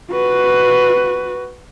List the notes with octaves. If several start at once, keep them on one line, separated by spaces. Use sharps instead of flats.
F#4 B4